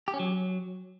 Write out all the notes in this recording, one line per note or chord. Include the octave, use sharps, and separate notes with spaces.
G4
C#4
F#3